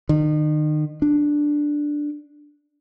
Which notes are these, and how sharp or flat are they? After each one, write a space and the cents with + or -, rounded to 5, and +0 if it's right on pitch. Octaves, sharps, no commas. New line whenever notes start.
D#3 -35
D4 +0